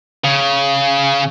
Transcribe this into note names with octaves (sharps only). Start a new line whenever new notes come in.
C#3